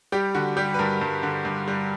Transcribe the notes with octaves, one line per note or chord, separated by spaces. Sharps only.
G3 G4
D3 F#4
G3 G4
B4
G2 A#4
G2
D3
G2
G3